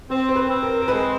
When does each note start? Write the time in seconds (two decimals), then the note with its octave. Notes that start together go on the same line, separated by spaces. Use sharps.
0.10 C4 C5
0.29 C5
0.36 B4
0.49 C4
0.63 A#4
0.82 A#4
0.88 G#3 B4